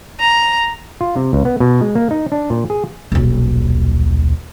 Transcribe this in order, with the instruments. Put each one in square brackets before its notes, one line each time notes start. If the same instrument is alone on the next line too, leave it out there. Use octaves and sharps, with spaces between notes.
[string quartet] A#5
[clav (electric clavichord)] F4
C3
C#2
B3
B2
G#3
A#3
D#4
D4
A#2
G#4
[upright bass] D#1 B1